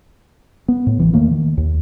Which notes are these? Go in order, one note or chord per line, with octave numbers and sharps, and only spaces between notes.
B3
A2
A1 A2 E3
E2 D#3 A3 A#3
D#3
D#2